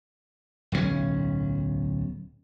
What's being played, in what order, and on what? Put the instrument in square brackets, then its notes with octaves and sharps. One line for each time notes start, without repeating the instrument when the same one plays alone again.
[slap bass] D1 B1 A#2 C#4